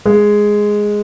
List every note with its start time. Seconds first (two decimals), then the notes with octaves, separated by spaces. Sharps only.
0.06 G#3